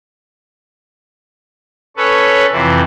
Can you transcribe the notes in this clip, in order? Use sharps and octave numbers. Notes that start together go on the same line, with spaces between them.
C#4 A4 B4 C#5
F2 C3 E3